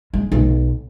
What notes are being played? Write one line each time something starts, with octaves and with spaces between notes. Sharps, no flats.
G#3
B1